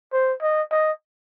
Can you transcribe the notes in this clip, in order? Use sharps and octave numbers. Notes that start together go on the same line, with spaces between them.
C5
D#5
D#5